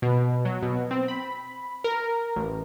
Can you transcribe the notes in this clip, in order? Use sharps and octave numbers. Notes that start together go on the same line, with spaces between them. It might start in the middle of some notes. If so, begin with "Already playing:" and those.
B2
F#3
B2
C4
B5
A#4
A1